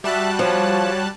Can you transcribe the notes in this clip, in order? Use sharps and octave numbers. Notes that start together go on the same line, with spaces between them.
G3 F#4 E5 A5 F#6
F3 C#5